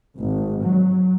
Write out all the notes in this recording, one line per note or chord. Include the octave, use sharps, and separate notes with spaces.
G#1
F#3